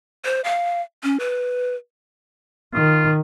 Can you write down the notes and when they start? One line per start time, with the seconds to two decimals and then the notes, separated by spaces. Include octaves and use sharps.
0.25 C5
0.44 F5
1.03 C#4
1.20 B4
2.74 D#3 F4